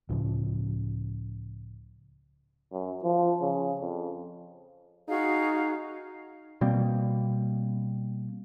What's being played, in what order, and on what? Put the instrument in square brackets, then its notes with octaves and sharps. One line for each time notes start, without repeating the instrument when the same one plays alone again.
[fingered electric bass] C#2 A2 C#3 F3
[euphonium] F#2
F3
C#3
F2
[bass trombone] D#4 [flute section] F#4 G#4 F5
[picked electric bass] B2 G3 A#3 C4